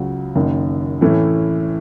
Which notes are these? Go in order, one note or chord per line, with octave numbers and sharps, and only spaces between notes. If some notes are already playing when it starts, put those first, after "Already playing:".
Already playing: C#2 C#3 F#3
F#1 F#2 D#3
A2 E3 A3 C#4 E4